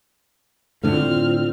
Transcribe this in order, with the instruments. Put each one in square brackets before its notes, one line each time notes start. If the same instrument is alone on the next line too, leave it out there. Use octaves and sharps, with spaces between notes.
[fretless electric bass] A2 D3 A3 [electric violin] C4 F6 [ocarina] F4